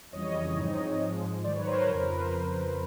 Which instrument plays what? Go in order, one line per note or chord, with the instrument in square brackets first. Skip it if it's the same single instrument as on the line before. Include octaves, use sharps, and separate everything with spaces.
[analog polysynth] F2 C#3 E3 G3 C#5 D#5
G#2 F3 G#3 C4 D#4
G#2 F3 G#3
G#2 D#3 F#3 C5 D5
B4 C#5
A#4 C5
B4
F2 C#3 F3 A#4
B4
A#4 C5